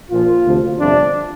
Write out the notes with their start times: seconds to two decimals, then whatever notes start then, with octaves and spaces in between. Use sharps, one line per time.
0.11 A#1 A#2 F3 F4
0.45 D2 C3 F3
0.79 G1 F2 C3 F3 D4